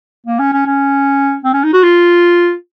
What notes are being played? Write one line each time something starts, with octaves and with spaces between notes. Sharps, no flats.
A#3
C#4
C#4
C#4
C4
C#4
D#4
F#4
F4